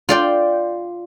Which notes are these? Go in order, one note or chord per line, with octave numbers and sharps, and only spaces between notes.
F4 D5 G5